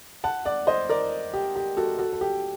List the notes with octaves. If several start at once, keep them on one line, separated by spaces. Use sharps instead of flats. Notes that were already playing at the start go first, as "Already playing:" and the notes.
F#5 A5
D5 F#5
C5 D#5
A#4 D5
G4
G4
F#4 A4
F#4 A4
A4
G4